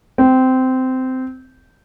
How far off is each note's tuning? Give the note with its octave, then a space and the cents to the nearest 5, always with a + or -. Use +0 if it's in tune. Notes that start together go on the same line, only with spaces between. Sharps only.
C4 -15